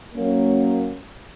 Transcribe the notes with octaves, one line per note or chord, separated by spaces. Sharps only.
F#3 A#3 C#4